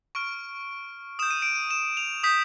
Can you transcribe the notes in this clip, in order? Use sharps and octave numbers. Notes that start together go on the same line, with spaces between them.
C#6 F6 D7
D#6 G6 E7
D#7
D7
D#7
E7
F7
D#6 G6 B6